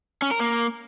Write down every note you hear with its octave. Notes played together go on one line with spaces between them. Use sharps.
C#4
A#4
A#3